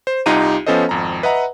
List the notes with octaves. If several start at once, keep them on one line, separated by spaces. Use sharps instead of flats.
C5
C2 D#4 F4 G4 A#5 D#7
F3 B3 C#4 A4 C5 D#5
G#1 F2 A#5
B4 D#5 E5 F#5 A#5